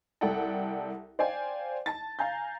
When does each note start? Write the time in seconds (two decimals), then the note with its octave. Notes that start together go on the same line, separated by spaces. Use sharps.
0.21 C2 A4 D5 F#5 G5 A5
1.19 C5 D5 F5 G5 G#5
1.86 A5 A6
2.19 F5 G#5 A#5 G6